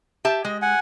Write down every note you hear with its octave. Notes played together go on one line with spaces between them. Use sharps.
G4 E5 A5
G#3 D#5
F#5 G#5